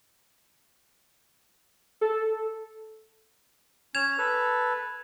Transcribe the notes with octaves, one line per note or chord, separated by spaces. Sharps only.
A4
C#4 G#6 E7 F7
A4 B4